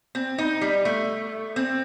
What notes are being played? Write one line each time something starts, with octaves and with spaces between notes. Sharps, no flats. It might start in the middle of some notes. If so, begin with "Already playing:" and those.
C4
D#4
G3
A3
C4